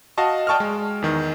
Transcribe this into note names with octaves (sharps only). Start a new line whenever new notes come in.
F#4 D#5 F5 A5 C#6
D5 G5 A5 C#6 D#6 F6
G#3
E2 D#3